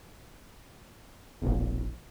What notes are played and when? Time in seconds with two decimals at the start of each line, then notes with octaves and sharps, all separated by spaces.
1.42 E1 A#1